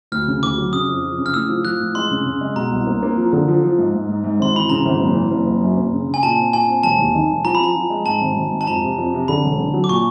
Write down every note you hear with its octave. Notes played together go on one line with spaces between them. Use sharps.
D2 F6
C#3
D2 D6
F#3
C#3 D#6
F2
F3
C#3
F6
A2 E6
F3
F3 F#6
A2
G#3 C6
C#3
C#3
G#3
B2 A#5
C2
A#3
A#3
F3
D3
F3
F3
G#2
G#2
G#2
G#2
G#1 C6
E3 B5
C#3 A#5
G#1
F#1
E3
F#1
F#1
F#2
F#1
C#3
C#3
G#5
A#2 A5
C4
A#2 G#5
C4
E1 A5
D#2
D#3
E1
F3 A#5
B5
F3 A#5
F3
G#3
G#2 A5
G#1
G#1
G#2
A5
F2 A#5
C3
F2
C3
D3 B5
E1
D3
F#3
D6
A#2 C#6